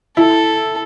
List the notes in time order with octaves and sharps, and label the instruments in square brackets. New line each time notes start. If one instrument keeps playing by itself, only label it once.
[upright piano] E4 [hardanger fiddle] A4